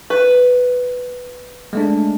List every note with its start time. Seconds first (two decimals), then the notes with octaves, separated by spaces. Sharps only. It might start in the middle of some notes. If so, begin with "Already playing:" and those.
0.10 B4
1.73 G#3 A3 D4